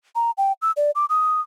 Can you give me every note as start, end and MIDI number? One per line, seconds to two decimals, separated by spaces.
0.15 0.31 82
0.38 0.52 79
0.62 0.71 88
0.77 0.91 74
0.95 1.05 86
1.09 1.41 87